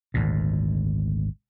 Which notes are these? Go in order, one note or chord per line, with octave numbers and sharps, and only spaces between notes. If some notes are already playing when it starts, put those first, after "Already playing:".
G#1 D2 A#2